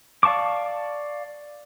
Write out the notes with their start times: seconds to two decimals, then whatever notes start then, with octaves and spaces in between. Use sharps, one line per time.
0.23 D5 F5 A5 C#6 D6